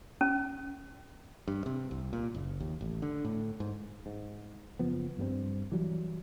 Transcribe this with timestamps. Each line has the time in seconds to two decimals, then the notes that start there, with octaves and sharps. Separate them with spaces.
0.21 C#4
1.48 G2
1.66 C3
1.91 C2
2.13 A#2
2.35 F#1
2.60 D#2
2.81 A1
3.02 D3
3.25 A2
3.60 G#2
4.06 G#2
4.79 F#1 F3 B3
5.18 G2 G3 B3 C4
5.72 E3 F#3 G3